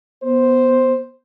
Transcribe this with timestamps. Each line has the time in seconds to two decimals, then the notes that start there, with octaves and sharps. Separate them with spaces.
0.23 B3 C5